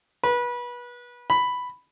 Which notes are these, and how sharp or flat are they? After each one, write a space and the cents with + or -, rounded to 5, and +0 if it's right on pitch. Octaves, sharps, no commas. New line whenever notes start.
B4 -25
B5 +5